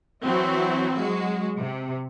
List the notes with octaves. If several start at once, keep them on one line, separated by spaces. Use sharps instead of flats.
E3 F#3 C4 E4 F#4
F#3 G#3 F#4
C3